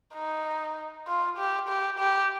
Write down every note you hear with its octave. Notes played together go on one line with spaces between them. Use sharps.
D#4
F4
G4
G4
G4